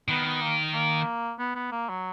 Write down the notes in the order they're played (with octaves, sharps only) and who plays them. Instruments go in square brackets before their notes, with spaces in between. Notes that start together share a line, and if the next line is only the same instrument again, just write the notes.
[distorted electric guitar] D#3 [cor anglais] B3
[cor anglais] B3
A#3
A#3
B3
B3
A#3
F#3